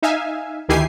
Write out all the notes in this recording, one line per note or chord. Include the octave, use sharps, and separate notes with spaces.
D#4 E5 F5 G#5
D2 D#3 E4 G4 G#5 C7